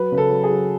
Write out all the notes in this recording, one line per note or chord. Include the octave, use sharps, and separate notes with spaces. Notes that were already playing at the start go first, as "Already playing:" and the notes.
Already playing: F#3 B4
C#3 B4
A4
F#3
G#4
F#3